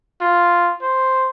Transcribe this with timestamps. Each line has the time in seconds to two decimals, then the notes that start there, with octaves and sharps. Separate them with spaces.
0.21 F4
0.81 C5